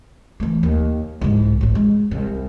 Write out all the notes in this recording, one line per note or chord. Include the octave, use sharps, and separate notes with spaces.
E3 A3
D#2
C2 G#2
G#1 A2
G#3
C2